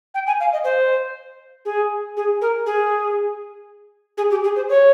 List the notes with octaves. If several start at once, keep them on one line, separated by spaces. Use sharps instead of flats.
G5
G#5
F5
D#5
C5
G#4
G#4
A#4
G#4
G#4
G4
G#4
C5
C#5